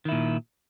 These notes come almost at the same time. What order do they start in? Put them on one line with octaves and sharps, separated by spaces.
D#3 E4 A#2